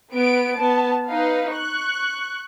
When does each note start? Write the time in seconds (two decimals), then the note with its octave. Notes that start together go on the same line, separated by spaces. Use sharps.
0.14 B3 B4 D7
0.56 B3 A5
1.08 D#4 B4 F5
1.52 C#6 F#6